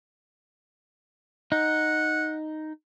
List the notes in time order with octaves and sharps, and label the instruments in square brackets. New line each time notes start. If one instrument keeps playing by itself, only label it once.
[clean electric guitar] D#4 [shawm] F#5